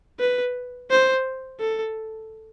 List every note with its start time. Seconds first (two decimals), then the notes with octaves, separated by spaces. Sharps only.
0.20 B4
0.90 C5
1.60 A4